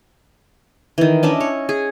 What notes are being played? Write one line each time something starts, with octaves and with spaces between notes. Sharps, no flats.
D#3 E3
C#4 D4 D#5 E5
C#5
G#4